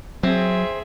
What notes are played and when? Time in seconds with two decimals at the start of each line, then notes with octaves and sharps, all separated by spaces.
0.23 F#3 C4 G#4 E5